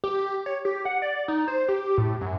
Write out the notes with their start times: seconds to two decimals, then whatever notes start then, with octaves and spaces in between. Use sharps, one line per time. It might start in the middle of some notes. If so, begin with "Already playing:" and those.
0.04 G4
0.46 C#5
0.65 G4
0.85 F#5
1.02 D5
1.28 D#4
1.48 C5
1.69 G4
1.98 A2
2.21 F#2